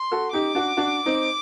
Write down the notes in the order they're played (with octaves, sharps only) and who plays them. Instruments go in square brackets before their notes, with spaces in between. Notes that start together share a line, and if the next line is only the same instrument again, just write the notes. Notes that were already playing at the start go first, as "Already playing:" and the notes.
Already playing: [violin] C6
[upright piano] F#4 A4
[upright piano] D#4 G4 [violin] D6
[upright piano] D4 F#4
D4 F#4
C4 D#4